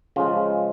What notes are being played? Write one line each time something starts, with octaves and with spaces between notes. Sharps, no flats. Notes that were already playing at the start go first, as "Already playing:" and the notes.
C#3 F3 G#3 F4